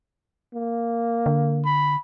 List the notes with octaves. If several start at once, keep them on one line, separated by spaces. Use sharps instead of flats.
A#3
D3
B5